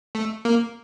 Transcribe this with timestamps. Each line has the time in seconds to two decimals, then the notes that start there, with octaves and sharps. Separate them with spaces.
0.15 A3
0.45 A#3